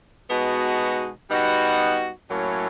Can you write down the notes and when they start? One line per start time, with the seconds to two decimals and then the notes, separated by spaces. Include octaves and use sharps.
0.30 B2 G#3 B3 D#4 F#4
1.30 G3 B3 D#4 F#4
2.30 A2 F#3 A#3 C#4 E4